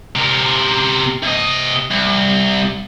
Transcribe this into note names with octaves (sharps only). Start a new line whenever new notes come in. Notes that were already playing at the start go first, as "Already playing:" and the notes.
C3 A#4
C3 D#5
C2